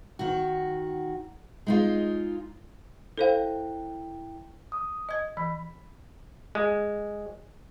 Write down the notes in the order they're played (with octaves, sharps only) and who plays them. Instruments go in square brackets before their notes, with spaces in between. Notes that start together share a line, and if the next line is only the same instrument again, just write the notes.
[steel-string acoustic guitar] D#3 F#4
G#3 D#4 F4
[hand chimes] E4 G5 [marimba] A4 C5 F5
[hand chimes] D#6
[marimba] D#5 G#6
[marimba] E3 [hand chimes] B5 B6
[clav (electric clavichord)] G#3